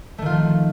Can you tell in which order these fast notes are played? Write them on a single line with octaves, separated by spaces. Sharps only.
A3 D#3 F4 F3